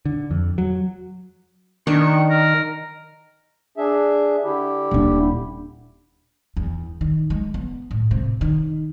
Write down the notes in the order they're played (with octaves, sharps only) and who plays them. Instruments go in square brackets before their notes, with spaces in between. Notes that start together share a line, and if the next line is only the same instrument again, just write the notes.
[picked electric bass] D3
F2
F#3
[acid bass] D#3 [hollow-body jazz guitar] D4 [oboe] C#6
[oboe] A#4
[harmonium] D4 G#4 E5
D3 E4 G4
[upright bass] D#1 D4
E2
D#3
G#3
B3
A2
C3
D#3